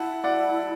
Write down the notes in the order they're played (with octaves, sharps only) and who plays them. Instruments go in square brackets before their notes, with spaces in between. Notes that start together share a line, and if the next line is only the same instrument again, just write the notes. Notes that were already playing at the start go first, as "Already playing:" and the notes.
Already playing: [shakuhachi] E4 [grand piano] F#5 A5
[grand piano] D5 F#5